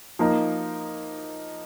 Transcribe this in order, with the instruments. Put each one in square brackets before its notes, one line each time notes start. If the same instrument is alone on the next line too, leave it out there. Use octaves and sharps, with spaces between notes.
[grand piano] F3 A#3 D#4 A#4